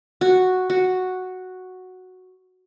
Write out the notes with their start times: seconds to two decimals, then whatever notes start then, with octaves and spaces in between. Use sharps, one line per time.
0.21 F#4
0.70 F#4